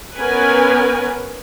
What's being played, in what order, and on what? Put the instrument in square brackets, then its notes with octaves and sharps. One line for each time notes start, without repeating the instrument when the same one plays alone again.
[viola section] B3 C#4 A#4 B4 G#5